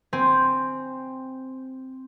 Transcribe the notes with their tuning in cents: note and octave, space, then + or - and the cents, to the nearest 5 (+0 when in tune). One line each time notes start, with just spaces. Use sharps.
C4 +0 G#5 +0